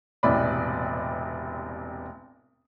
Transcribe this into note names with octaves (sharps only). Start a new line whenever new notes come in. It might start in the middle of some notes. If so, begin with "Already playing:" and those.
E1 A1 C3 D5 B5